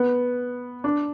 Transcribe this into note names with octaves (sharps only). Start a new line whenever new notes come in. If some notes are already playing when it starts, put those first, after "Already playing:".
Already playing: B3
D4